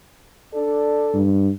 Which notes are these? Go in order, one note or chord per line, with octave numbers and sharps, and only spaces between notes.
D4 A4 D5
G2